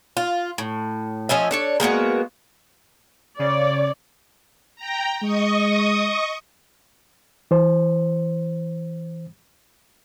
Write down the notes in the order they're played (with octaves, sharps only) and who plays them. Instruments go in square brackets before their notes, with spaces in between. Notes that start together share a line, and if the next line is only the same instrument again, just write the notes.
[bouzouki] F4
A2
F3 C#4 D#5 E5
D4 A4 C#5
G#3 A#3 B3 F#4
[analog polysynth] C#3 [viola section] C#5 D5
[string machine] G5 A#5
[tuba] G#3 [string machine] D#5 C#6 D#6
[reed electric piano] E3 C5